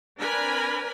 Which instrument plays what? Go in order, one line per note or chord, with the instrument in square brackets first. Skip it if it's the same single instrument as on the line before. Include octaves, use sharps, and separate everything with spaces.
[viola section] C4 D4 A#4 B4 G#5 B5